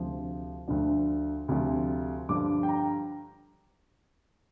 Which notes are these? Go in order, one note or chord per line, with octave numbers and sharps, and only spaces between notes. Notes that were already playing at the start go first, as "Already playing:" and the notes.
Already playing: D2 C3 F3
D2 D3 F3
D2 C3 F3
G2 D3 F3 D6
G5
A#5